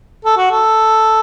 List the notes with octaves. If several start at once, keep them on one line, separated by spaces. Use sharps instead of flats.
A4
F#4
A4